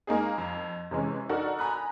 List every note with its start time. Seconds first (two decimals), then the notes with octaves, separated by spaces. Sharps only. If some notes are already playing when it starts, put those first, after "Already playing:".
0.07 G#3 A#3 D#4 G#4
0.38 F2
0.91 C3 E3 G#3 C#4
1.29 D4 D#4 F#4 A4 A#4 D5
1.59 G#5 A#5 B5 D#6 F#6